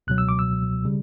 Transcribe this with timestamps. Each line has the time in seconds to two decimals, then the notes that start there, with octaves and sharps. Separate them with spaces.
0.07 C#2 B2 F#3 F#6
0.18 E6
0.29 D6
0.39 E6
0.85 C#3 G3